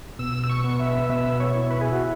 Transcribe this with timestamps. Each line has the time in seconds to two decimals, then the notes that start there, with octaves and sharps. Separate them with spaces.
0.19 B2 E6
0.43 E6
0.49 C#6
0.64 B3
0.80 E5
1.10 B2 E5
1.40 C#5
1.55 E4
1.70 B4
1.81 G#4
1.92 F#4